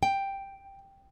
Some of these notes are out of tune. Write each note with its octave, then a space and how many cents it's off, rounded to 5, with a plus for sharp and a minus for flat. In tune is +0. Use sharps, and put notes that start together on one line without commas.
G5 +5